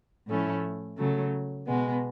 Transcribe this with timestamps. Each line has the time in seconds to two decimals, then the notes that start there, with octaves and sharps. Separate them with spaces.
0.27 A2 F3 A3 C#4 E4
0.97 C#3 F#3 A3
1.67 B2 G#3 B3